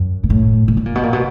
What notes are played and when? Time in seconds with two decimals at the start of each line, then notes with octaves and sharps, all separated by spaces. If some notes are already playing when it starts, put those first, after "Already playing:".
Already playing: F#2
0.24 A#2
0.30 A2
0.68 A#2
0.77 B2
0.86 A#2
0.95 B2
1.03 A#2
1.13 B2